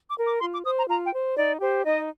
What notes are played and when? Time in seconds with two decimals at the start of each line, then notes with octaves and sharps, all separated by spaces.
0.09 D6
0.17 A#4
0.25 D6
0.41 F4 C6
0.53 D6
0.65 C5 D#6
0.77 A#5
0.89 F4 A#5
1.05 G5
1.13 C5
1.37 D#4 D5
1.61 G4 C5
1.85 D#4 D#5